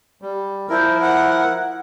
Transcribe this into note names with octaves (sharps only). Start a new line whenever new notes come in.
G3
F3 E4 A#4 C5
F#5